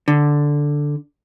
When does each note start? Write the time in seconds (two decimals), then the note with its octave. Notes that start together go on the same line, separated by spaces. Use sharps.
0.08 D3